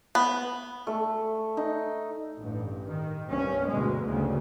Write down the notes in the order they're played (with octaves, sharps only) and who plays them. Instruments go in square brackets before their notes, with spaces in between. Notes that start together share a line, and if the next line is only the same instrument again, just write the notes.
[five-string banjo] B3
[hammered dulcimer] A3
D#4
[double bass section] A1 G2
D#3
C2 G2 C#4
D2 G2 B2 G#3
G1 D2 G2 C#3